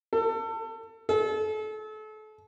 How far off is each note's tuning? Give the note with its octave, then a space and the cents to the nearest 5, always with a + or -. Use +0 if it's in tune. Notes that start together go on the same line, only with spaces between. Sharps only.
A4 +30
A4 -35